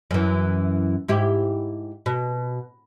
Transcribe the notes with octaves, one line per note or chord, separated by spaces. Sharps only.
F#2 E3
G#2 E4 G4
B2